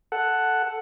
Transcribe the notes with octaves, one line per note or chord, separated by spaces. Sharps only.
A4 F#5